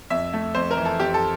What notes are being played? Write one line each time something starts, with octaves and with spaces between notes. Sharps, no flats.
F2 E5
A3
F2 C5
A#4
E3
A4
F2 G4
A4